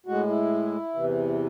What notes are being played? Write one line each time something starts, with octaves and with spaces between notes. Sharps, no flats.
A2 G#3 F#4
E4
E2 C3 E3